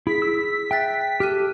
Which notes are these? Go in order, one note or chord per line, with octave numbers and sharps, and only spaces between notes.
E4 G#4 B6
E6
E5 G5 F#6 A6
G4 A4 F6 F#6 D#7